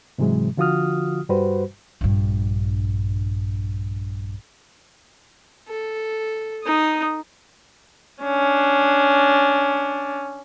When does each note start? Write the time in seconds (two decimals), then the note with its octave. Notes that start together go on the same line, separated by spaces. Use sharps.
0.18 G#2 C3 E3 F#3 G#3
0.57 D3 F3 F4 F#4 D#6 F6
1.29 G2 G3 F#4 B4 C5
2.01 A#1 G2
5.69 A4
6.64 D#4 D#6
8.22 C#4 D4